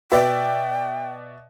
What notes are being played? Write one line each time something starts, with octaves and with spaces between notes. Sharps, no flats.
B2 F#4 B4 D5 E5 G5